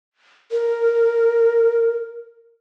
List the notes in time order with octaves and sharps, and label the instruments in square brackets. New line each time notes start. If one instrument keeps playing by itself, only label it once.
[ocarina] A#4